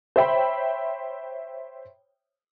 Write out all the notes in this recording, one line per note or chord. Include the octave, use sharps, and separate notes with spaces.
C5 C#5 E5 G5 B5